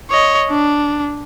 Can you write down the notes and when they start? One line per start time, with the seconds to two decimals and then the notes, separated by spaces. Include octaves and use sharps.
0.11 C#5 D#5
0.50 D4